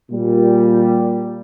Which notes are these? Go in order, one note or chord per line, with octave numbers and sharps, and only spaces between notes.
A#2 G3